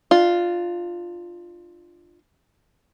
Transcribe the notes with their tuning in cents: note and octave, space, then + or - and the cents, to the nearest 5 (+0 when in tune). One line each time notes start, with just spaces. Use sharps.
D4 +35 F4 +0